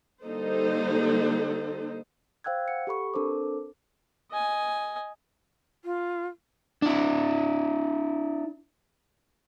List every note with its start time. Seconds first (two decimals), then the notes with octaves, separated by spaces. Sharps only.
0.25 D3 G3 A#3 D#4 A4 C5
2.44 C5 F5 G5 E6 F#6 G#6
2.68 F#5 C#7
2.87 G4 A4 B5 C#6
3.14 C4 D4 A4 A#4 C5 D6
4.31 D#5 G#5
5.85 F4
6.82 D4 E4